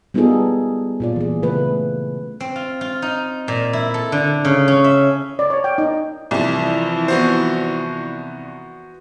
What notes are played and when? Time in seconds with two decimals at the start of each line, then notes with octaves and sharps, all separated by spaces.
0.14 G3 B3 D#4 F4 G#4 A4
1.00 A#2 F4 D5
1.16 E3 G#4
1.43 C#3 A3 F4 B4
2.40 C4
2.56 F4
2.81 F4
3.02 D#4
3.48 A#2
3.73 E4
3.94 A4
4.12 D3
4.45 C#3
4.68 C#4
4.84 E5
5.39 D5
5.50 C#5
5.64 G5
5.78 D#4
6.31 C2 E3 F3
7.08 B3 F#4 C5